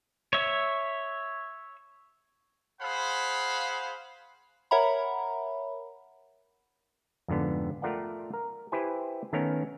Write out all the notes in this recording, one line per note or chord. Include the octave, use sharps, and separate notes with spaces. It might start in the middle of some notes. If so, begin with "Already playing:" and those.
C#5 E5
G#4 C5 F5 F#5 B5
A#4 C#5 E5 F#5 A#5 B5
F2 G#2 D3 B3
A3 F4 A#4 D5 F#5 G5
A#4
E4 G4 B4 C5 G#5
D#3 A3 B3 C#4 A#4 A#5